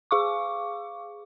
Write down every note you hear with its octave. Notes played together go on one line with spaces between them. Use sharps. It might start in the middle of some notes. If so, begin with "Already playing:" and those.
G#4 F5 C#6 D6